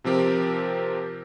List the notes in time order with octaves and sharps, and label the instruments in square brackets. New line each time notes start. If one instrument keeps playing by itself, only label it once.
[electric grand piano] C3 F3 C4 G4 A#4